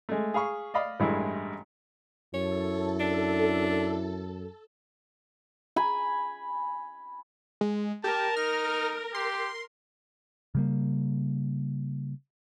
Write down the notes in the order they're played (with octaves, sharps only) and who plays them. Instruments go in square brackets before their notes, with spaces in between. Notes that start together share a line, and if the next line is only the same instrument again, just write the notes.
[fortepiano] G#3 A3
G#4 F5 B5 C#6
D5 D#5 F5 B5
A1 G2 G#3 E4 E5
[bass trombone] F#2 [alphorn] E4 [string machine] A4 [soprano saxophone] C#5
[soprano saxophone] D4
[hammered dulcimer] G#5 B5
[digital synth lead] G#3
[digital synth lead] G4 [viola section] A#4 [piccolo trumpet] A5
[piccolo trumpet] D#4 [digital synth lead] F6
[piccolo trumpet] G4 [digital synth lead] C6
[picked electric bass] C#3 G3 A#3